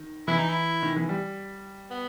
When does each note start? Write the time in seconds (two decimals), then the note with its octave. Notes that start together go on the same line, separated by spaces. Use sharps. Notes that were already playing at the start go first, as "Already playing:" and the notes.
Already playing: D#3
0.28 E3 E4
0.38 D#4
0.49 E4
0.83 D#3
0.96 E3
1.09 G3
1.91 B3